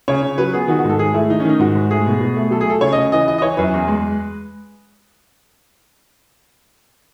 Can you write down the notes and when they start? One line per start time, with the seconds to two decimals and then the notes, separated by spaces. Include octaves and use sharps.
0.08 C#3 C#5
0.23 C#3
0.38 F#3 B4
0.53 B3 G#4
0.68 D#3 F#4
0.79 F#4
0.84 G#2 A4
0.99 D#3 G#4
1.14 A3 E4
1.30 D#3 D#4
1.40 C#4
1.45 D#3 D#4
1.59 G#2 F#4
1.75 G#2
1.91 A3 G#4
2.06 B2
2.21 B2
2.36 A3
2.51 F#3 A4
2.61 G#4
2.66 A3 A4
2.81 C#3 C#5
2.92 D#5
2.97 C#3
3.12 E3 D#5
3.28 E3 D#5
3.38 D#5
3.42 E3 C#5
3.57 F#2 B4
3.74 E2
3.88 G#3